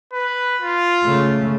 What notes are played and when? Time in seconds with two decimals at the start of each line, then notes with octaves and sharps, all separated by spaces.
0.14 B4
0.61 F4
1.04 C#3 A3